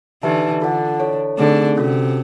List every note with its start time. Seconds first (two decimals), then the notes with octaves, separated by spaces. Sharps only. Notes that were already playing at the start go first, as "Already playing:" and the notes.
0.23 D3 E3 D#4 G4 B4 E5 A5
0.62 D3 F4 A4 D5 F#5 A5
1.00 E4 A4 C#5
1.38 D3 A3 C4 D#4 G#4
1.77 C3 C#4 F#4 A4